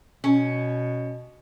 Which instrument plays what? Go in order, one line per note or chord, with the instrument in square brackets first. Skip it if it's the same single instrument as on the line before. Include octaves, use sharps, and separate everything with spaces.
[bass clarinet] B2 [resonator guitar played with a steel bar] C#4